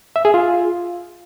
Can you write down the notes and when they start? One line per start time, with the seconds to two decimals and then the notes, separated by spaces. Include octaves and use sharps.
0.16 E5
0.25 G#4
0.34 F4